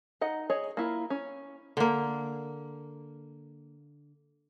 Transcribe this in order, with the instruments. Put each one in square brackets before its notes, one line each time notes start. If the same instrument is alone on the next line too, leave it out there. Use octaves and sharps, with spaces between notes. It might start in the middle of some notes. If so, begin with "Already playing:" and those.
[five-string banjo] D#4 D#5 F#5
G#4 C#5 D#5
A#3 E4 F4
C#4
[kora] D3 A#3